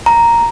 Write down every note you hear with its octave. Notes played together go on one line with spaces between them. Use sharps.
A#5